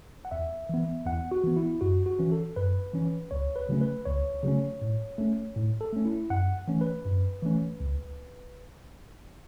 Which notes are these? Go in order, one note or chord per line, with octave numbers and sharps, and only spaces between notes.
F#5
E2 E5
E3 B3
E2 F#5
F#4
E3 B3
E4
F#2 F#4
F#4
E3 C#4
A4
F#2 B4
E3 C#4
C#2 C#5
B4
C#3 F#3 A3 C#4
B4
C#2 C#5
C#3 F#3 A3 C#4
A2
A3 C#4
A2
A4
A3 C#4
E4
F#2 F#5
E3 A3 C#4
B4
F#2
E3 A3 C#4
C#2